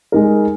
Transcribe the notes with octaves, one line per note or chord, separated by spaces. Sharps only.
G#3 D#4 A#4